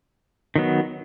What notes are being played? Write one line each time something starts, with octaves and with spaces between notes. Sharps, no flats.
D#3 F#3 B3